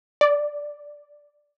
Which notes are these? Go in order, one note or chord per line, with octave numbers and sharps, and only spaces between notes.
D5